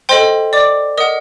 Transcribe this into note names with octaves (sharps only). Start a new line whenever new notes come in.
A4 C5 D#5 G5 C6
D5 D6
A#4 D#5 F#5 D#6